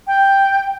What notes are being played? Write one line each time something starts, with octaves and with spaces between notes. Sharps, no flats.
G5